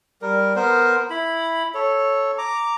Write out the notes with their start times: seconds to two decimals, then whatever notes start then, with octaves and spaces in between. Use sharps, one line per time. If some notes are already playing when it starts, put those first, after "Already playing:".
0.22 G3 A#4
0.56 B3 A#4 C5
1.10 E4 B5
1.74 A4 C#5
2.38 A#5 D6